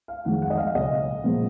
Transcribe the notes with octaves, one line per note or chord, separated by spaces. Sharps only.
F5
F2 D#3 G#3 F#5
F#5
D#5
F5
C#2 B2 F#3 D#5
A#2 F3 G#3 B3